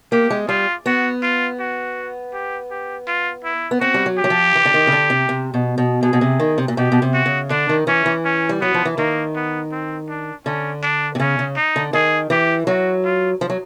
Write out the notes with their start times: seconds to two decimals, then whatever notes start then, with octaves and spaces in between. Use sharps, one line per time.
0.12 A#3 G4
0.30 G#3
0.49 G3 F4
0.86 B3 F#4
1.23 F4
1.60 F#4
2.33 G4
2.71 G4
3.07 F4
3.44 E4
3.71 B3
3.81 C4 F#4
3.94 G3
4.06 F#3
4.18 G4
4.24 F#3
4.30 F3
4.55 E3
4.65 D3
4.74 D#3
4.87 C#3
4.92 D3
5.10 C3
5.29 C3
5.54 B2
5.78 B2
6.03 B2 G#4
6.13 B2
6.21 C3
6.40 D#3
6.58 C3
6.68 A#2
6.77 B2 G4
6.92 B2
7.02 C3
7.14 F#4
7.26 C#3
7.50 D3 D4
7.69 D#3
7.87 E3 C#4
8.06 E3
8.25 C#4
8.49 G3
8.61 F#3 B3
8.74 F3
8.85 E3
8.98 D#3 A#3
9.35 B3
9.72 C4
10.09 D4
10.46 D3 C#4
10.83 D4
11.15 C3
11.20 C#3 C#4
11.39 C#3
11.57 D#4
11.76 D3
11.93 D#3 G#4
12.30 E3 G4
12.67 F#3 F#4
13.05 F4
13.41 F3
13.50 F#3